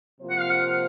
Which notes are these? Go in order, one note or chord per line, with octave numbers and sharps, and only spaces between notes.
C3 F3 A#3 F4 C5
F#5
F5
F#5